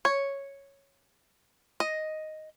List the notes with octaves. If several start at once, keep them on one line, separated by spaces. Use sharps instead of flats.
C#5
D#5